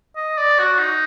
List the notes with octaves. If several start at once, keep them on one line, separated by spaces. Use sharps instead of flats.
D#5
D5
F#4
D#4